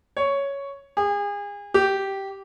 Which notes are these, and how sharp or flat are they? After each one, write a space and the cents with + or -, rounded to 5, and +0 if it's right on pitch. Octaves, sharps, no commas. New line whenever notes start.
C#5 +5
G#4 -35
G4 -10